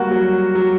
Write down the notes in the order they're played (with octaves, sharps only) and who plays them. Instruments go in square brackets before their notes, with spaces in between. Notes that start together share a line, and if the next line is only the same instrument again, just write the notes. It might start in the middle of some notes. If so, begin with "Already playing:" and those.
Already playing: [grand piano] G3 [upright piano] A#3 F#4
[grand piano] F#3
F#3